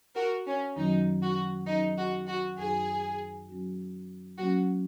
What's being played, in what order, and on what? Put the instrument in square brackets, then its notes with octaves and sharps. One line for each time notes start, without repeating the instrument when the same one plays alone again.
[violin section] F#4 A#4
C#4
[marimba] F#2 D#3 F#3 C#4 F#4 [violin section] D#4
[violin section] F#4
[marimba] F#3 C#4 G#4 [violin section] D#4
[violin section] F#4
F#4
[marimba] F#2 F#3 D#4 F#4 [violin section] G#4
[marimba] F#3 C#4 F#4
[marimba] F#3 A#3 C#4 [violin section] F#4